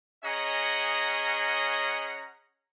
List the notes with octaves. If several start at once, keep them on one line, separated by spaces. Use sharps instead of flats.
C#4 G#4 C#5 D#5 F#5 A#5